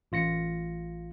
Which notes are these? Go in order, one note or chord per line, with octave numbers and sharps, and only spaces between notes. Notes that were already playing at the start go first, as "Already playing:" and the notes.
A1 F4 A#6 C#7